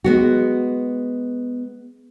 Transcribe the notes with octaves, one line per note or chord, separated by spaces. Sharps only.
G#3 B3 F#4